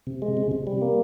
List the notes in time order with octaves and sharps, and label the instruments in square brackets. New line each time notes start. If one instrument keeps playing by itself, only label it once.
[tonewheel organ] C3
G#3
C3
C3
G3
A#3